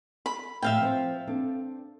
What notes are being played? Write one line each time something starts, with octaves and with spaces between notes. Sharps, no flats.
B5
A2 F3 E5 F5 G5
F3 C4 C5
C4 D4 A4